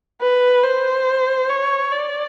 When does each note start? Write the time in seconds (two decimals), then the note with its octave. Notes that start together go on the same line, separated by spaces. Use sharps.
0.21 B4
0.64 C5
1.49 C#5
1.91 D5